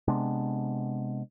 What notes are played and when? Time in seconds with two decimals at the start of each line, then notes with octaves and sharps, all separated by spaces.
0.08 C3 G#3 B3 D4